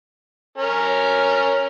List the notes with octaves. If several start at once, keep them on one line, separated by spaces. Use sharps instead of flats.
C#4 A#4